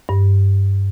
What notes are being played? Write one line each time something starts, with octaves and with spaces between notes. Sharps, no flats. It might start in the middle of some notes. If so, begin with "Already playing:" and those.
G2